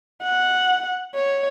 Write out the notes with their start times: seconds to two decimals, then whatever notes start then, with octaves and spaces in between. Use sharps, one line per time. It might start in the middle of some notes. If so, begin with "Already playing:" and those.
0.23 F#5
1.15 C#5